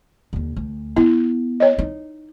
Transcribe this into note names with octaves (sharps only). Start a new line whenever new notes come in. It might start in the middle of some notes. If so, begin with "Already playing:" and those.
D#2 D3
D2
B3 E4
C#5 D#5
D#4